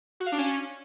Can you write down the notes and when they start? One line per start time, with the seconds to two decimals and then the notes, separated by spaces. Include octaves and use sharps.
0.20 F#4
0.26 F5
0.32 D4
0.38 C#4